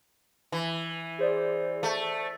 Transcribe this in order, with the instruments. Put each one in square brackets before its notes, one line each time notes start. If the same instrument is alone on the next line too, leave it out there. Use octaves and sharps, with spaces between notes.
[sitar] E3
[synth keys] G#4 C5 D5
[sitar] A3